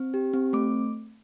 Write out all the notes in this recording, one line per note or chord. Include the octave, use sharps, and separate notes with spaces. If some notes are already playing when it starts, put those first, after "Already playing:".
Already playing: C4
G4
C4
A3 D6